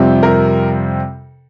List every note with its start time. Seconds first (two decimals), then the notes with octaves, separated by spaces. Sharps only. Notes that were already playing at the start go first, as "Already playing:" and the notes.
Already playing: F2 C3 G3 C4 G4
0.23 A#4